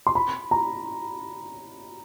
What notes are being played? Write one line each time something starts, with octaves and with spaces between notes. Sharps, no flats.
C6
B5
A#5